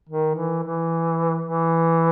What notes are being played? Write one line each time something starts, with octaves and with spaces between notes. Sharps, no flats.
D#3
E3
E3
E3